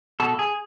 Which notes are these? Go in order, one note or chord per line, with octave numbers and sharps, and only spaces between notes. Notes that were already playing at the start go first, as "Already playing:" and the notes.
B2 A4
G#4